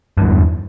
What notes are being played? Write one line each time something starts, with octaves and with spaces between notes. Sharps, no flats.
E2 G2 E3